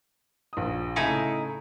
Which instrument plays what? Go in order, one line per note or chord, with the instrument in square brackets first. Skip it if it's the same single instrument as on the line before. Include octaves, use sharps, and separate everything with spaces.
[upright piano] A#1 D#6
[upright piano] A2 C#3 A3 [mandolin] D#4 E4 G#5